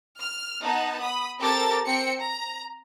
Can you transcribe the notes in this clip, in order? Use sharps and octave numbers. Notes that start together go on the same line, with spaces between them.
F6
B3 D#4 A5
B5 D#6
C4 G4 A4 A#4 A6
C4 G5 C#7
A#5